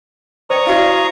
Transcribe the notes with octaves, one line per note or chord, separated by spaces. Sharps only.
C5 D5 G5 A#5 C#6 D#6
E4 F#4 D5 F5